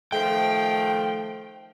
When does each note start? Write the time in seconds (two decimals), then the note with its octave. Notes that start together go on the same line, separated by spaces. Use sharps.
0.12 D#3 F3 A3 G5